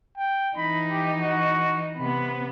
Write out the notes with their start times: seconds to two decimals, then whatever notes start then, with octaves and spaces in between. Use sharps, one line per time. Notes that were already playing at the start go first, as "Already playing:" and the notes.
0.17 G5
0.56 E3 D#4 B5
0.90 G4
1.20 F#4
1.97 C3 B3 B5